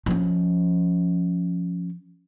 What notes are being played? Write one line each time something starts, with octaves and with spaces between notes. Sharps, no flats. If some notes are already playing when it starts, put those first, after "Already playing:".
F3 C#4